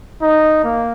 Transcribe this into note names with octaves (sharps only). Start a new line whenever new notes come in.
D#4
A#3